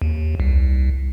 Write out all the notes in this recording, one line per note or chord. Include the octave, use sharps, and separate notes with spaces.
D#2
C2